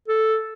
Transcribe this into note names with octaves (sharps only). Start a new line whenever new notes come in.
A4